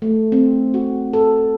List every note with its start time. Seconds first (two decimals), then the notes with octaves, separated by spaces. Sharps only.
0.02 A3
0.32 C4
0.74 F#4
1.13 A4